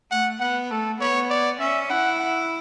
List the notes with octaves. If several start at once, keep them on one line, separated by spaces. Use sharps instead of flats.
A3 F#5
B3 F#5
A3 A4
B3 C#5
D5
C#4 E5
E4 F#5
F#5